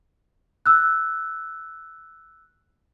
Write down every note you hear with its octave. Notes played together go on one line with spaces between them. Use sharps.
E6 F#6